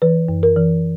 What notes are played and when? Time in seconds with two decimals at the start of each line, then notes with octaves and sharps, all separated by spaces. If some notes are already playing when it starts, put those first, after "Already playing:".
0.02 E3 B4
0.28 F#2
0.43 A#4
0.57 E3